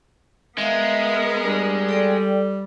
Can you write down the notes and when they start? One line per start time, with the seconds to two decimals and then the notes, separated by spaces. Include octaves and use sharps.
0.58 G#3 B3 A#4 E5 F5
1.44 G3 D4
1.89 A4 D5 G5